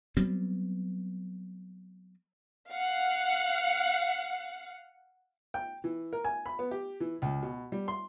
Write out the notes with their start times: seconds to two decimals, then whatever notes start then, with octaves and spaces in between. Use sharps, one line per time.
0.17 F#3 G3 B3 C4
2.70 F5 F#5
5.54 G5
5.84 E3
6.13 A#4
6.25 G#5
6.46 B5
6.59 B3
6.71 G4
7.00 E3
7.22 C#2
7.42 B2
7.72 G3
7.88 C6